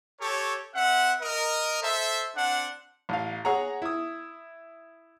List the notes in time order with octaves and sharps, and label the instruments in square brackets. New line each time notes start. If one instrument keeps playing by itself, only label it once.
[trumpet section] G4 A4 C#5
C4 E5 F#5
A#4 D#5
A4 C5 E5
C4 D4 F#5
[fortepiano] A1 F5
G#4 C#5 F#5 A#5
E4 D#6